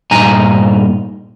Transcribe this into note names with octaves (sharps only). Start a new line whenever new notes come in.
G2 A#2 D#4 G#5 A#5